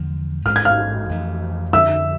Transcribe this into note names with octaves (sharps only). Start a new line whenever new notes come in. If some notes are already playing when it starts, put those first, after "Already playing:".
Already playing: E2 D3 F3 G#3
A1 G#2 G#3 F6
G#6
F5 F6
F2 E3 A3
F2 D3 F3 E5 E6